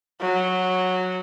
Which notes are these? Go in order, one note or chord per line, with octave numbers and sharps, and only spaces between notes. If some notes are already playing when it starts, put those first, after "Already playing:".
F#3